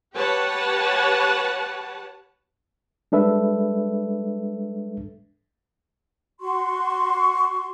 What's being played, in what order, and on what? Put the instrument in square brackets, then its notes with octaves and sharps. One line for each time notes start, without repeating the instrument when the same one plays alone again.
[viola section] G4 B4 C#5 F#5 A5
[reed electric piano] G3 G#3 D4 A4 B4 E5
[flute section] F#4 C6 C#6